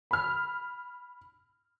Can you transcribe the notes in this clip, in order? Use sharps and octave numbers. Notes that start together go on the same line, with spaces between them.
B5 F6